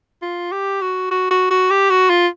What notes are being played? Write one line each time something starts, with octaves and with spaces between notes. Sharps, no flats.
F4
G4
F#4
F#4
F#4
F#4
G4
F#4
F4